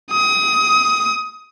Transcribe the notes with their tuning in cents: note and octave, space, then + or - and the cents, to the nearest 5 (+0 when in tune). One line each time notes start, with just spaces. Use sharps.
D#6 +25